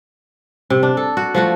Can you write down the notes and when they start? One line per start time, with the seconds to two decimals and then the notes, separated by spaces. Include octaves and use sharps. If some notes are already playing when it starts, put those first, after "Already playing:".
0.70 C3
0.83 D4
0.97 A4
1.17 F#4
1.35 F3 A3 F#4